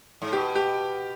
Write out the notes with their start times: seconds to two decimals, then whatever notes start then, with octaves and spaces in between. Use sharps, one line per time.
0.22 G#2
0.33 B2 G4
0.55 G4